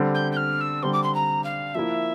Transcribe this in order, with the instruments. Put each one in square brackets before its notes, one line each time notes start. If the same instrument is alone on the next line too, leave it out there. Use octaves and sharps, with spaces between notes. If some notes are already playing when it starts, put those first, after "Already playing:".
Already playing: [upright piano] D3 G3 C4
[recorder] G6
G6
F6
E6
[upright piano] D3 G3 C4 [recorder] C6
[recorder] D6
C6
A#5
F5
[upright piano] F3 A#3 E4 [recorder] E5